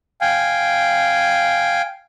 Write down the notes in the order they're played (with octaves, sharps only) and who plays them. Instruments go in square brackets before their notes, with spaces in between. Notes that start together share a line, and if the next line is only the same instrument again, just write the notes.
[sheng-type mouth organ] F5 G5 G#5